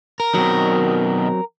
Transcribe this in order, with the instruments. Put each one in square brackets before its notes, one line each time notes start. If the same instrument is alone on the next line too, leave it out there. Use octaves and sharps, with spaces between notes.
[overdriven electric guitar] A#4
[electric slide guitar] B2 D#3 [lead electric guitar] F#3 C4